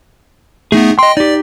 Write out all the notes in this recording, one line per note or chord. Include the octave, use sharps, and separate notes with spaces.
A3 B3 D#4 G#4
D#5 G5 C6
D#4 G4 D5